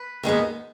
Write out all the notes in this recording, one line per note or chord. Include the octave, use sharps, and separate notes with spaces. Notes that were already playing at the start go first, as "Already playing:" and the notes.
Already playing: B4
D#2 D#3 G#3 B3